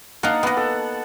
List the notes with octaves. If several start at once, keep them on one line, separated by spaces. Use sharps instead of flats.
A#3 D#4 F5 F#5 A5
A#3 B3 D#5 F#5
A4